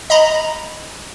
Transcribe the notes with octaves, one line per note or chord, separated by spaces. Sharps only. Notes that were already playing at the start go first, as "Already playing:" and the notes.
D#5 A#5 B5